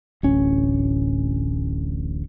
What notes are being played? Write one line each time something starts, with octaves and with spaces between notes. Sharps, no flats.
D1 A1 C#4